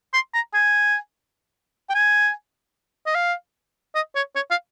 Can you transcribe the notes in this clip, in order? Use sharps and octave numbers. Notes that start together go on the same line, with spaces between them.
C6
A#5
G#5
G5
G#5
D#5
F5
D#5
C#5
C#5
F5